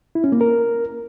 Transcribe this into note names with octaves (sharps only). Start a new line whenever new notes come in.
E4
C#4
A#3
A#4